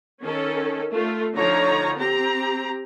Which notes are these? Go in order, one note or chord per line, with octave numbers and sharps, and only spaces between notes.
D#3 C#4 A4
A3 F4
D3 F3 D#4 C#5 A#5
C4 G4 A#5